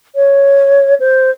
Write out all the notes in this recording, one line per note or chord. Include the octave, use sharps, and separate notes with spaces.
C#5
C5